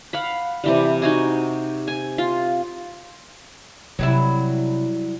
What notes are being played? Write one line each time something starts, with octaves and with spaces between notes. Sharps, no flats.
F5 F#5 B5
C3 E3 G3
D#4 F#4 G#5
G#5
F4
C3 F#3 G3 E4